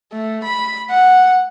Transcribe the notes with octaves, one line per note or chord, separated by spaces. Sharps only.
A3
B5
F#5